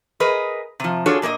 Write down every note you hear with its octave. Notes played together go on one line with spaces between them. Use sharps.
G#4 A#4 B4 D#5
C3 F3
D4 F4 F#4 G#4 A4 C#5
A#2 A#3 C5 D#5